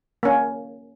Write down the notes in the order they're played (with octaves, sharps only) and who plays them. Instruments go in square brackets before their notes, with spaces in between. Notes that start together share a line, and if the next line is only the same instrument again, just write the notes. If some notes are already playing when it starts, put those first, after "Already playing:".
[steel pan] A#3 C#4